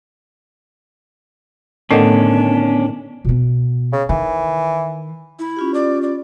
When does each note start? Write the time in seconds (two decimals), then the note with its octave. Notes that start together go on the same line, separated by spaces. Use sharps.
1.91 A2 D3 D#3 A3 B3 C#4 D4
3.25 B2 B3
3.92 C#3
4.09 D#3 E3
5.39 E4
5.56 C#4 F4 G4
5.74 D5
6.02 D5